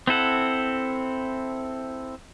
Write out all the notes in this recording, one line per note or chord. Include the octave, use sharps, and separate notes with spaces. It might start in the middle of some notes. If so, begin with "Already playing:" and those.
C4 E4 A4 F#5